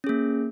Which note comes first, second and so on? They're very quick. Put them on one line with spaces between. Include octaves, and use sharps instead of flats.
C#4 G#4 A#3